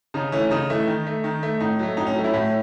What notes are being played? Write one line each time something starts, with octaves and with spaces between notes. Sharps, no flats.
C#3 D#4
E3 A3 C#4
C#3 D#4
E3 A3
D#3
A3
D#3
A3
A2 D#4
F#3 A3
A2 D#4
C#4
F#3 A3
C#4 E4
A2